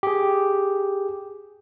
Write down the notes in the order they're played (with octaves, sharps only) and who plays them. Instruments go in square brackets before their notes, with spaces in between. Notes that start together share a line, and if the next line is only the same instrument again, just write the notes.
[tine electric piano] G4 G#4